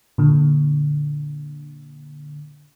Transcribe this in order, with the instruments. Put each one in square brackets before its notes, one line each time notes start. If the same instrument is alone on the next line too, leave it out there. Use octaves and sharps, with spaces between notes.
[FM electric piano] A#2 D3